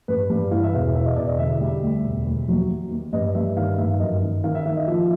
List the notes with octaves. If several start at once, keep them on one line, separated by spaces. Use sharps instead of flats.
G2 B4
G2
E3 F5
E5
E1 F5
E3 E5
D#5
E1 D5
D#5
D3 E5
G3
D2
E1
D#2
F#3
D#2
D#2
G2 D#5
G2 E5
D#3 F5
G2 E5
F#2 D#5
D#3
D#3 F5
E5
D#3 E5
D#5
F3 E5